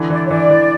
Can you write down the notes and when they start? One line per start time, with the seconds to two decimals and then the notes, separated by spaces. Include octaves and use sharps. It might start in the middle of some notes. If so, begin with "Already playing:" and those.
Already playing: D3 E3
0.10 E3 D5
0.25 C#5
0.30 E3 D5
0.50 E3